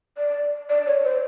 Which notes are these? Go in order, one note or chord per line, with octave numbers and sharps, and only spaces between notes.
D5
D5
C#5
C5